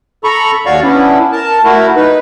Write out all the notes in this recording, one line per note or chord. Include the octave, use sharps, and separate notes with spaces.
A4 A#5 B5 C#6
D#2 F#4 C#5 D5 F5 C#6
B3 C#4 D4 E4
A#4 A5
A3 E4 F#4 A#4
D#4 B4